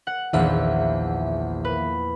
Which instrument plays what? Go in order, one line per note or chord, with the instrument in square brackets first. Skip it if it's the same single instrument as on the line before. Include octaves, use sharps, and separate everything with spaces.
[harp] F#5
[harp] A#1 E2 [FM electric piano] D#3 E5 F#5
[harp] B4